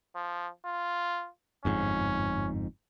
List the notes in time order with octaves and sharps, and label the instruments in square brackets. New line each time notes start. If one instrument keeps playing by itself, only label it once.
[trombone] F3
F4
[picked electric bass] G1 F2 G#2 [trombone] C#4